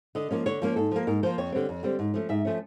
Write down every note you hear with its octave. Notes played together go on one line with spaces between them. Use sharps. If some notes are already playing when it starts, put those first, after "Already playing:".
D3 D#5
F3 A#3 C#4
D3 C#5
F3 A#3 C#4
G#2 A4
F3 A#3
G#2 A#4
F3 A#3 C5
F2 C#5
D3 G3 C4
F2
D3 G3 C4
G#2
F3 A3 C#4
G#2 E5
F3 A3 C#4